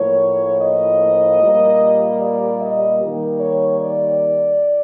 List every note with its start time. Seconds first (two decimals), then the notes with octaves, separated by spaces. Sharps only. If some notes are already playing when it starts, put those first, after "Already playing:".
Already playing: A2 F3 A#3 C#5
0.61 D#5
1.41 A#2 G3 A#3
2.20 D5
2.60 D#5
3.00 D#3 G3 A#3
3.40 C#5
3.80 D5